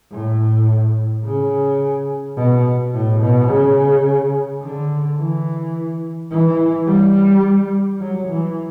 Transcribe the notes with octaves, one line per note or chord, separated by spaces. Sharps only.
A2
C#3
B2
A2
B2
C#3
D3
E3
E3
G3
F#3
E3